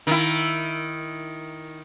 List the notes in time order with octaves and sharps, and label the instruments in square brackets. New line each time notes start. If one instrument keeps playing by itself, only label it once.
[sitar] D#3 E4